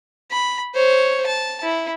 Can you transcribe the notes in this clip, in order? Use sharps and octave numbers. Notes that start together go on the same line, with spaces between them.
B5
C5 C#5
A5
E4